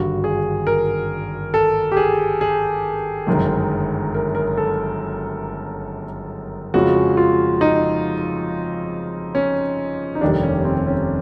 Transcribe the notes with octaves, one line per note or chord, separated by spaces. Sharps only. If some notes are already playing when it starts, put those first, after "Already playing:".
Already playing: G#1 G2 D3 F#4
G#4
A#4
A4
G4
G#4
G#4
G1 F#2 D#3 G#3
A#4
A#4
A4
F2 C#3 F3 G#3 F#4
F4
D#4
C#4
D#4
F1 D#2 D#3 G3 D4
C#4
C4
C#4